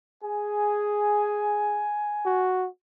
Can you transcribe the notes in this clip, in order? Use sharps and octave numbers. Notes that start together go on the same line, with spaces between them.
G#4 G#5
F#4